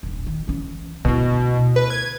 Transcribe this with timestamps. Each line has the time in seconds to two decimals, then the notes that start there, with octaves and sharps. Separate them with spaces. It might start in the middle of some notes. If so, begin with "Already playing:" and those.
0.03 D#1 A#1
0.27 D#3
0.48 E3 C#4
1.05 D2 B2 E4
1.76 B4
1.90 G#6